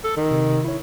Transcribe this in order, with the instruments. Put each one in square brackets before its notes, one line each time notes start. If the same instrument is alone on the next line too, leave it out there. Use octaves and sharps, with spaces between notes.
[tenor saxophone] A4
D#3
[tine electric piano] C3
E4 C#5